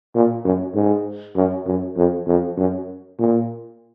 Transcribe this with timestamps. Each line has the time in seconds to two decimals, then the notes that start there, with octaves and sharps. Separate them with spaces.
0.15 A#2
0.45 F#2
0.75 G#2
1.36 F#2
1.67 F#2
1.96 F2
2.27 F2
2.57 F#2
3.19 A#2